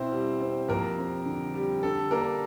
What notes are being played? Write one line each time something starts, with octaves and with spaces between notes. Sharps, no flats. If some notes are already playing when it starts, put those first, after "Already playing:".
Already playing: B2 C4 E4 C5
G3
C4
F2 A#3 A#4
C4
D3
G3
D3 A4
A#3 D4 A#4